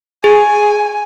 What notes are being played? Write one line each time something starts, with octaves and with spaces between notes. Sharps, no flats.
G#4 G#5